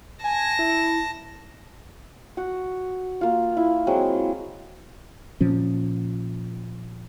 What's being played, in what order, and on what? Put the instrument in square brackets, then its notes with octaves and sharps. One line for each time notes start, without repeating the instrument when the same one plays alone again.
[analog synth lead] G#5 [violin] A5 A#6
[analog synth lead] E4
[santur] F#4
A#3 F4
E4
F#3 G#3 C4
[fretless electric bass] A#2 F3 C#4